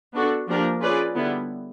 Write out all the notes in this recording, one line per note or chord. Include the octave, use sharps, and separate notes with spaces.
B3 D4 F#4 A4
F3 A#3 D4 G4 A#4
C#4 F4 G#4 B4 D5
D3 G3 B3 E4